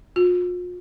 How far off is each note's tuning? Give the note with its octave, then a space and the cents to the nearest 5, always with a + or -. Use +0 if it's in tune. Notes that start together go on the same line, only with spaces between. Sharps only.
F4 +40